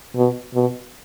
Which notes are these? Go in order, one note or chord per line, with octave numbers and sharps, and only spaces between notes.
B2
B2